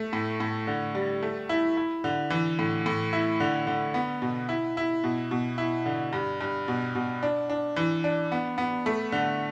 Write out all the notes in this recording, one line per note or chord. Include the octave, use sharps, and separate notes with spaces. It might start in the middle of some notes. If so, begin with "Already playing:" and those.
Already playing: A3
A2
A2
D3
G3
A3
E4
E4
D3
E3
A2
A2
E4
D3
D3
B3
B2
E4
E4
B2
B2
E4
D3
G2
G2
B2
B2
D4
D4
E3
D4
B3
B3
A3
D3